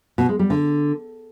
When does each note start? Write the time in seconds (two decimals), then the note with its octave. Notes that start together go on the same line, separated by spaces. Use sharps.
0.18 B2
0.29 G#3
0.39 G3
0.50 D3